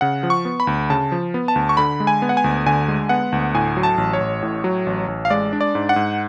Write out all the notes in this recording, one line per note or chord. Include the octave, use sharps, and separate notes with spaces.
C#3 F#5
F3
C#6
B3
B5
D2
C#3 A5
F3
B3
A5
D2
C#6
D3 B5
G#3
G#5
B3
F#5
G#5
D2
D3 G#5
G#3
B3 F#5
D2
A2 G#5
F#3
A5
A1
C#5
A1
A2
F#3
A1
A1
F5
G#3 D5
D4
D5
G#2
F#5
G#2